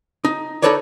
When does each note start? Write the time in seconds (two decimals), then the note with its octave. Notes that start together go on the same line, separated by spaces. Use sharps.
0.25 D#4
0.62 D#4 F#4 A4 B4 C#5 D5